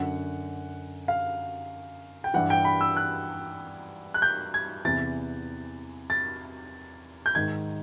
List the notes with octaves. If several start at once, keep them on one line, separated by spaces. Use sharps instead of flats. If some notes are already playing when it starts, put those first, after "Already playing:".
Already playing: F#2 D3 F#5
F5
G5
G2 E3 F#5
G5
B5
E6
F#6
F#6
G6
G#6
E2 C3 E3 A6
A6
G6
G#2 D#3 G#6